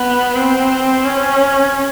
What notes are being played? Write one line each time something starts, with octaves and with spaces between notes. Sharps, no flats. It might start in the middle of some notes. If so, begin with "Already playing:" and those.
Already playing: B3
C4
C#4